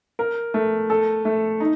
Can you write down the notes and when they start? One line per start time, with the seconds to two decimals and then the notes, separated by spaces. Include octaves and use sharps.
0.19 A#4
0.54 A3
0.90 A4
1.25 A3
1.60 D#4